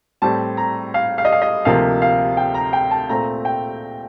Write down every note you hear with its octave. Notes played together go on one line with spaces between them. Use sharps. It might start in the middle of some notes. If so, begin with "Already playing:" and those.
A2 G3 C4 A5
A#5
F5
F5
D#5
F5
D#5
D2 C3 F3 A#3 F5
F5
G5
A#5
G5
A5
A#2 A3 C4 A#5
G5